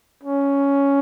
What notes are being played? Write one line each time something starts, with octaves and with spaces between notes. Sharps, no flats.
C#4